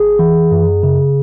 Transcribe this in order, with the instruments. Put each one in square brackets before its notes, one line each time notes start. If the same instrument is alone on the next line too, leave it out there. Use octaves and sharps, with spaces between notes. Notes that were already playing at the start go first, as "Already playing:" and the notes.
Already playing: [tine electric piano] G#1 G#4
E3
F#2
C#3